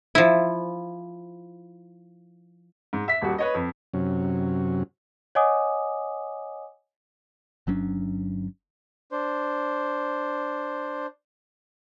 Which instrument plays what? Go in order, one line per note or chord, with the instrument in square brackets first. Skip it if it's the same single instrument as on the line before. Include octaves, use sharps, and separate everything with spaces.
[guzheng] F3 E4
[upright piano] G#2
E5 B6
D#1 G3 F#4
B4 C#5 D#5
F2
[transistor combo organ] F#2 C3 F#3 C#4
[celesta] C#5 D#5 F#5 G#5 D6 D#6
[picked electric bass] G1 F#3 C#4 D4
[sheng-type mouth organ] D4 C5